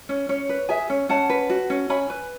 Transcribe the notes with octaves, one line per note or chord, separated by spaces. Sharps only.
C#4
C#4 C#5
B4
G#4 E5 G#5
C#4
C#4 F#5 A5
B4
F#4
C#4
C#4 G#5 B5
B4